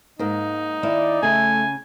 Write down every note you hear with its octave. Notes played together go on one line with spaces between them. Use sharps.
G#2 A#3 D#4
D#3 A#3 E4 D5
C#3 A3 G#5